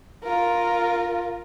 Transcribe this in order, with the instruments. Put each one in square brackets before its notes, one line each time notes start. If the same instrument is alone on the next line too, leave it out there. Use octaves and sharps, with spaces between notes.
[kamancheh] F4 A#4